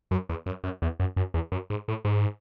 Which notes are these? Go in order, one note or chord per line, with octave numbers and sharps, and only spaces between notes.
F#2
E2
F#2
F#2
E2
F#2
F#2
E2
F#2
G#2
A2
G#2